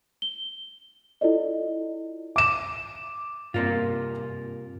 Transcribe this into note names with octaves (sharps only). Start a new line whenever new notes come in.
G7
E4 F4 A4 D5 D#5
D6 E7
G2 C3 A#3 F4